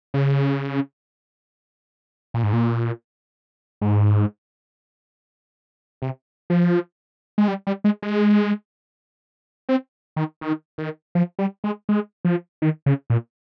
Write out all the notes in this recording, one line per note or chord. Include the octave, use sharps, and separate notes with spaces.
C#3
A#2
G#2
A#2
G#2
C3
F3
G#3
G3
G3
G#3
G#3
C4
D#3
D#3
D#3
F3
G3
G#3
G#3
F3
D#3
C#3
A#2